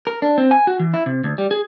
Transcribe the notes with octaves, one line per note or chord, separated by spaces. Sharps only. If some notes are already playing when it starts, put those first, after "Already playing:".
A#4
D4
C4
G#5
F#4
E3
E4
C3
D2
G3
G#4